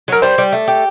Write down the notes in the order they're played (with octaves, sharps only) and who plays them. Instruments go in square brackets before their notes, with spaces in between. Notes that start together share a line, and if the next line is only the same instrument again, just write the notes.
[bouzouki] F#3 [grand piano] A#4
[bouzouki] G3 [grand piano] C5
[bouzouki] G3
A3
G4